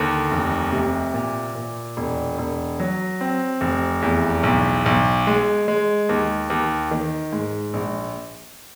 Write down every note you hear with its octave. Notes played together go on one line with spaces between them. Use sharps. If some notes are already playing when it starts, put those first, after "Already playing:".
Already playing: D#2 D3
F1
C3
A#2
A#2
E1
E1
F#3
C4
F1
E2
B1
B1
G#3
G#3
D#2
D#2
D#3
G#2
A#1